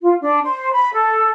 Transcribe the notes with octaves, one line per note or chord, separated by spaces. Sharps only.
F4
D4
C5
B5
A4